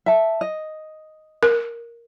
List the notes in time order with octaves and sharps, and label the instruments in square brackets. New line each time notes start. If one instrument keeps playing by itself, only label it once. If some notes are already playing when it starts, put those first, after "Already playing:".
[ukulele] E5 A5
D#5
[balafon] A#4